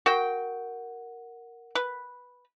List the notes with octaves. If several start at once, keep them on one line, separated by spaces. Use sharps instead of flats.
F#4 A#4 F#5 G5
B4